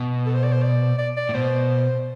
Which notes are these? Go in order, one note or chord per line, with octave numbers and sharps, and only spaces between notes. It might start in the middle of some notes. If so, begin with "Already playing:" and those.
Already playing: B2
A4
C5
D5
C5
D5
D5
D5
A2
B2 C5